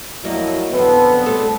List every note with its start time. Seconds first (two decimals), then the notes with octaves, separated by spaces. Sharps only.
0.24 F2 F#3 A#3 E4 D#5
0.73 F2 B2 D3 F3 B3 B4
1.26 G3 A3 C4 A4